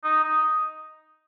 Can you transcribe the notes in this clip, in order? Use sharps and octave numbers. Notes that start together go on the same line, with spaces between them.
D#4
D#4